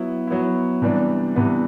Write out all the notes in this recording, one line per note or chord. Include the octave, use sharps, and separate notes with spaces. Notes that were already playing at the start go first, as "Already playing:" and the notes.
Already playing: F#3 B3 E4
F#3 B3 E4
C3 E3 G3 B3 D4
C3 E3 G3 B3 D4